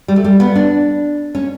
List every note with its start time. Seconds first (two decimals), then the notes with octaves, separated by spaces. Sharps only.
0.08 G3
0.16 A3
0.24 G3
0.40 B3
0.55 D4
1.35 C#4